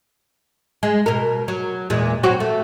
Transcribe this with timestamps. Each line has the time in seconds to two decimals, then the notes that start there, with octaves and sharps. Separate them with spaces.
0.83 G#3
1.06 B2 A#4
1.48 F#3
1.90 E2 A#2 G#3
2.23 F#3 C4 F#4
2.40 A3